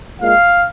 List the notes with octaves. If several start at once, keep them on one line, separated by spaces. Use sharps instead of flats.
A#2 G#3 F5